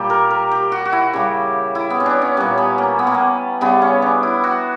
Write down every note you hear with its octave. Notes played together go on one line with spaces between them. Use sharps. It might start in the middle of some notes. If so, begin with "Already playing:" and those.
Already playing: A#2 G3 G4
A#4
A#4
G4
F#4
F#4
E4
C#3 G3 G4
E4
B3
C#4
D4
C#4
A#2 G3 C#4
B3
A#3
B3
A#3
B3
C#3 G3 B3
C#4
D4
E4
F#4